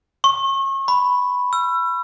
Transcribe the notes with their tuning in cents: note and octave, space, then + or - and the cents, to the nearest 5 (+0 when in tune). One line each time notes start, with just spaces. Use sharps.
C#6 -35
B5 +5
E6 +40